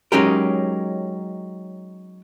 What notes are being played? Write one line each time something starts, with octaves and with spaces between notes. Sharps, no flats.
F#3 G#3 C#4 D#4 G4 A#4